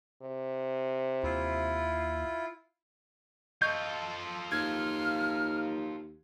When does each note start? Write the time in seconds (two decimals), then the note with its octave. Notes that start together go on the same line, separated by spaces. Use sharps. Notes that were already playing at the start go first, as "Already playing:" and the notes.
0.22 C3
1.23 D#2 E4 F4
3.62 F4 A4 D#5 C#6 G6
4.52 D#2 F6 G#6